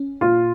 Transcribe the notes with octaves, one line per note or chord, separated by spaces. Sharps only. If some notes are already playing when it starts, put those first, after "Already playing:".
Already playing: C#4
A#2 F4